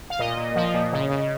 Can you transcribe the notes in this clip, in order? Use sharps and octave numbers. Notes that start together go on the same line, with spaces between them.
F5
A#2 D#5
A#2
F3
A#2
C#3
C#3